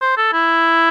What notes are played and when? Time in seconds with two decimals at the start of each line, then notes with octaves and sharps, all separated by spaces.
0.02 C5
0.17 A4
0.33 E4